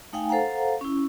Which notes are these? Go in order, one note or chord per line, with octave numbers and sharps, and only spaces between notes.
A3 D#4 F5 G5 G#5
A4 C5 F5 F#5 A#5
C#4 E4